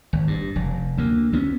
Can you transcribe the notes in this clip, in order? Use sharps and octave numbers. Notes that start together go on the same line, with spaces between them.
G#1
G2
F1
D2 A#3
D2 B3 C#4